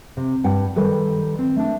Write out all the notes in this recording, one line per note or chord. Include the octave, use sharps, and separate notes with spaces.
C3
G2 F#5 G5
D#3 G3 A4 B4
C4
A3 D4